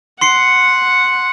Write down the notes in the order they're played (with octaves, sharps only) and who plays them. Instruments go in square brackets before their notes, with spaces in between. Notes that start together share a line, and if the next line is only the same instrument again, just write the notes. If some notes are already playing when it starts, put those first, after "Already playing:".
[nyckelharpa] F#5 [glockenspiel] C6 C7 C#7